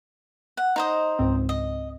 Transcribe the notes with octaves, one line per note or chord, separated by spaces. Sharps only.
F#5
D#4 C5 D#5
C#2 G#2 C4
D#5